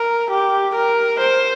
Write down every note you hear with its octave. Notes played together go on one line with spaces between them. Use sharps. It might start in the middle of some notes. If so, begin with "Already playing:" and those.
Already playing: A#4
G4
A#4
C5